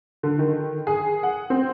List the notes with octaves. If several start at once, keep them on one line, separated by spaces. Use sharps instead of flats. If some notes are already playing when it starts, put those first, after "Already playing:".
D3
D#3
G#4
F#5
C4